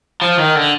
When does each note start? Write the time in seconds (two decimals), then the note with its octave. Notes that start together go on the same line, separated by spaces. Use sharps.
0.22 F3
0.39 D#3
0.55 D3